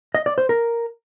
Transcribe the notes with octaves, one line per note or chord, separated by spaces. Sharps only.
D#5
D5
C5
A#4